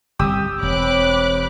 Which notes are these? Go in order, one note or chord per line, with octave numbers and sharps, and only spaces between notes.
G1 C2 G3 G4 D#6 E6
E1 C4 C#5 B5 D6 F#6